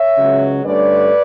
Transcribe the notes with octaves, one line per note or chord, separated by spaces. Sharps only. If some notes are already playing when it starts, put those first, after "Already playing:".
Already playing: C#5 E5
C#2 C#3 F#3
G2 D3 A3 C#4 B4 D5